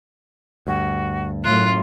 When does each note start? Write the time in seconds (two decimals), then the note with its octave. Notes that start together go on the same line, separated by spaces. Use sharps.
0.67 D2 G2 F#4
1.44 F#2 A2 F4 F#6